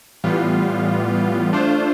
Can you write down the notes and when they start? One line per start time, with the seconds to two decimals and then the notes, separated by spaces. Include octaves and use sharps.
0.24 A2 E3 G3 B3 F4
1.53 A3 D4 F4 C5